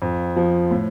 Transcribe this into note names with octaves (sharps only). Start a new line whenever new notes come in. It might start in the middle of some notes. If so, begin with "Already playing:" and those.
F2
F3
A2